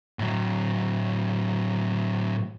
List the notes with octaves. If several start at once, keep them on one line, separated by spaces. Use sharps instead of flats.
A2 F#3